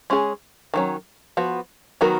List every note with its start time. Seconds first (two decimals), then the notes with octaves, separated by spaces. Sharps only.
0.10 G#3 C#4 G#4
0.74 D#3 F#3 C#4
1.37 F3 B3 F#4
2.01 D#3 F#3 B3 F#4 A#4